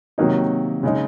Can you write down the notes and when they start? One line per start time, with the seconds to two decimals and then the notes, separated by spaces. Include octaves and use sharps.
0.18 C3 D#3 F#3 A#3 D#4
0.83 C#3 G#3 D#4